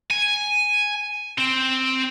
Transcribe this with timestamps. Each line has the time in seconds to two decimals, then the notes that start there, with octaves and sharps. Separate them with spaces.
0.10 G#5
1.38 C4